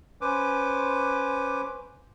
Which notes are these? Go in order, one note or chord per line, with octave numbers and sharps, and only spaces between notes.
C#4 B4 C5 D6